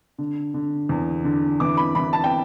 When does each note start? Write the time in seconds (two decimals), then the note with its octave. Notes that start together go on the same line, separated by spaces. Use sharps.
0.18 D3
0.54 D3
0.89 E2
1.24 D3
1.60 E3 D6
1.77 B5
1.95 E3 B5
2.13 A5
2.24 G5